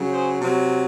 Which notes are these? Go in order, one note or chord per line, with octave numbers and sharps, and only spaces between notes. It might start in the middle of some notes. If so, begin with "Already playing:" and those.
Already playing: C#3 F#3
G#4 C5
C3 F#3